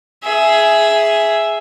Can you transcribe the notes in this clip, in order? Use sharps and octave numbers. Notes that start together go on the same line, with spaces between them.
G#4 E5